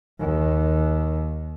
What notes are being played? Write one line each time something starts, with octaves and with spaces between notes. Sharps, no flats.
D#2